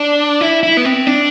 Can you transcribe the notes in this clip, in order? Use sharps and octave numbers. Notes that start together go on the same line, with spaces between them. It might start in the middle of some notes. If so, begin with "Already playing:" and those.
Already playing: D4
E4
E4
B3
C4
D4